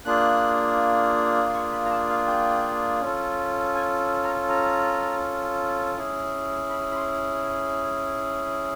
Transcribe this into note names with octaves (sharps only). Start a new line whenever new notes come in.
A#3 D4 F4 G#4 F#6
C6
C#6
B5
A#5
A5
F5
G5
C#4 F4 A4
G#5
A#5
A#5
C#4 E4 G#4
B5
B5
C6